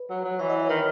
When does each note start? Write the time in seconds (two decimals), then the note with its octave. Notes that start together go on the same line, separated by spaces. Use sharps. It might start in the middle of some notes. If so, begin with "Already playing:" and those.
Already playing: B4
0.10 F#3
0.24 F#3
0.39 E3 C#5
0.50 D#5
0.60 C#5
0.69 D#3 B4